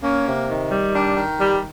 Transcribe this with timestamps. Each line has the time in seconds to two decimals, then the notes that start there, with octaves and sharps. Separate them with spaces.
0.03 A#3 C#4
0.26 C3
0.49 D#3
0.72 G3
0.95 D#3 D4
1.17 D#3
1.40 G3